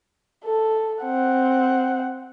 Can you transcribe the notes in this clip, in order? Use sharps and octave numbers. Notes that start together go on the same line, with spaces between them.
A4
C4 F#5